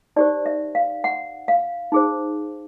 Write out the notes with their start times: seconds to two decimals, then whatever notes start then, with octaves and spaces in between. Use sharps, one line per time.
0.16 D#4 G4 C5 D5
0.46 E5
0.75 F5
1.04 F#5
1.48 F5
1.92 D#4 G#4 C5